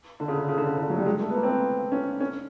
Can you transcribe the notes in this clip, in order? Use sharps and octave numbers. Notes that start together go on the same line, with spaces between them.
D3
C#3
D3
C#3
D3
C#3
D3
F#3
G3
G#3
A3
B3
A#3
C4
B3
C#4
C#4